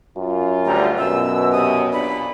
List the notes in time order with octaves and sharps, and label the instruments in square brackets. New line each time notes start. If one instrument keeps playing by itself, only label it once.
[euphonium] F#2 [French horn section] F4
[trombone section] D2 G3 [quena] A#5
[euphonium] F#2 [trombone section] B2 [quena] E6
[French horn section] C3 [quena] D#6
[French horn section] A#2 D4 [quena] B5